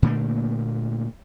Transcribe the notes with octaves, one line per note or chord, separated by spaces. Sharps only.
A#2 D3 A3 A#3